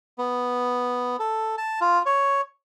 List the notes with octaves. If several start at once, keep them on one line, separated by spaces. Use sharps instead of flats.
B3
A4
A5
F4
C#5